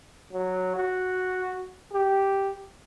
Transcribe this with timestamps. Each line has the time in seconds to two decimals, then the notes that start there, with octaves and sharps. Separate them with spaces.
0.32 F#3
0.76 F#4
1.92 G4